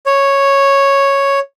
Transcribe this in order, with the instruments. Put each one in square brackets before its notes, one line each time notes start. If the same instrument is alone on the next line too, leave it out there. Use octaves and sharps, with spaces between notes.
[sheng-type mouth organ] C#5